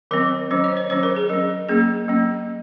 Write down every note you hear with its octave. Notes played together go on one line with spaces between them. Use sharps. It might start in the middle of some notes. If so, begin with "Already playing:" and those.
D#3 F#3 C4 A#4
D#3 F#3 C#4 C5
C#5
C5
D#3 F#3 C#4 C5
A#4
G#4
F#3 C#4 A#4
F#3 A#3 C#4 G#4
F#3 A#3 C#4